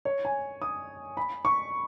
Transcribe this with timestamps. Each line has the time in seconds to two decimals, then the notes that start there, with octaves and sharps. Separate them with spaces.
0.05 C#5
0.25 G#5
0.62 D#6
1.17 B5
1.45 C#6